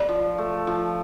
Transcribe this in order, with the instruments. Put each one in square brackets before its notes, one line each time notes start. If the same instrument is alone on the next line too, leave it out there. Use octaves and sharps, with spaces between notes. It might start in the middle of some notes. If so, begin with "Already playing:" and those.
Already playing: [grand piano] D5
[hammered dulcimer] F3
A3
F3